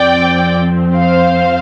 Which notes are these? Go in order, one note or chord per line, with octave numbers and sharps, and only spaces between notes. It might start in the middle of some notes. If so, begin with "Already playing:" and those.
Already playing: F2 F3 C4 D5 G5
C5 F5